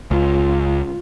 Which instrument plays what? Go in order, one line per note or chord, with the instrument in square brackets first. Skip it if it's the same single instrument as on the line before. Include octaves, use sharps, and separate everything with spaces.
[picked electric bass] C#2 [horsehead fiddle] F4